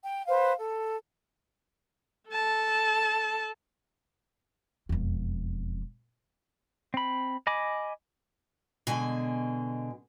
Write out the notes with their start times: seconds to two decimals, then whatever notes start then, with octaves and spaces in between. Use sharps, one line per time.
0.05 G5
0.28 B4 C5 F5
0.58 A4
2.29 A4 A5
4.89 E1 F2
6.94 C4 B5
7.47 D#5 G#5 B5 D6
8.87 B2 D3 G#3 G#5